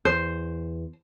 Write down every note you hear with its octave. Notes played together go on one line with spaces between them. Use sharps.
E2 C5